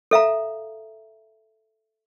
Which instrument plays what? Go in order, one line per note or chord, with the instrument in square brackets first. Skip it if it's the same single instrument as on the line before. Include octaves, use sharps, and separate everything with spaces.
[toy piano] A4 E5 F5 A#5